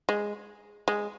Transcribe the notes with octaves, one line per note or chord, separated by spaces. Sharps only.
G#3
G#3